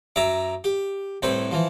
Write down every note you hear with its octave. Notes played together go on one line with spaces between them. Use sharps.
F#2 E5 A#5 D6
G4
C2 A2 B4 C5
E3 F3